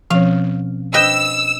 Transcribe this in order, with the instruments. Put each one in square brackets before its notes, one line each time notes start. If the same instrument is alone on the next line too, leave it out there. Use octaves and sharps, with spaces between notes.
[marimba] B2 C4 C#4 [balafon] F3 C#5 [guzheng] F5
[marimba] D4 C5 [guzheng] B4 D#5 G5 [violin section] E6